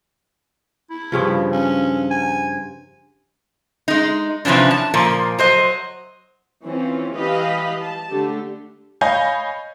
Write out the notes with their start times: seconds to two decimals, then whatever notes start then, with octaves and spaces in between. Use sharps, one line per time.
0.90 E4
1.12 G2 C#3 F3
1.52 C#4
2.10 G#5
3.88 G#3 D#4
4.45 C3 E3 F3 C#4 D4
4.71 A5
4.94 A#2 F3 A#3
5.39 F#3 C5 D#5
6.63 E3 C4 C#4 F4
7.14 E3 G4 B4 D#5 F5 B5
7.80 A5
8.09 D3 A3 G4
9.01 C#5 D#5 F5 G#5 B5 G6